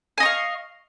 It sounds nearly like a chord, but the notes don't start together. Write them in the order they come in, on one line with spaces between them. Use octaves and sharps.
G#5 D#5 C#6 F5